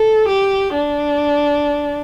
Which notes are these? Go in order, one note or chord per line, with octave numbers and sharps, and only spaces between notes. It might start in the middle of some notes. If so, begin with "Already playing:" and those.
Already playing: A4
G4
D4